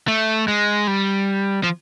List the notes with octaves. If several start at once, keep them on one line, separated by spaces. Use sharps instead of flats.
A3
G#3
G3
F3